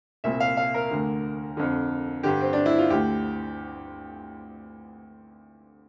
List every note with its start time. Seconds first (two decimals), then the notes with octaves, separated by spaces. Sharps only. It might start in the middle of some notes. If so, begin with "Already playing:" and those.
0.24 C2 A#2 E5
0.40 F5
0.57 F5
0.74 A#4
0.91 D2 D3
1.57 F2 D3
2.23 G2 D3 G4
2.41 C4
2.53 D4
2.66 E4
2.78 F4
2.90 D2 D3 G4